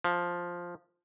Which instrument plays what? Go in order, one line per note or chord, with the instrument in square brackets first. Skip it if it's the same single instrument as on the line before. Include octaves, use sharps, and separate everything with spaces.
[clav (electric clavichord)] F3